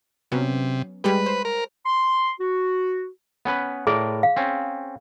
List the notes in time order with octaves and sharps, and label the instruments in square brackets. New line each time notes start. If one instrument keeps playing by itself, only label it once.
[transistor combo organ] C3 [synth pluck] F#3 B3 C#4
[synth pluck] G3 G#3 G4 [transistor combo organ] B4
[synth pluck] C5
[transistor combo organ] A#4
[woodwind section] C6
F#4
[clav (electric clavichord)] B3 C#4 B4
[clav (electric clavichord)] A2 A#4 D5 [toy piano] G#4
[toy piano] F5
[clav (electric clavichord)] C4 C#4